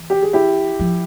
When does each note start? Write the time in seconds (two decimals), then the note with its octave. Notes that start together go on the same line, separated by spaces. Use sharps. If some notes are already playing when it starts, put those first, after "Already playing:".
Already playing: E3
0.10 G4
0.22 G#4
0.33 E4 G4
0.80 F3